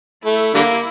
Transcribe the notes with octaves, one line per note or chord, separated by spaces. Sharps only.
A3 E4
D3 G3 A#3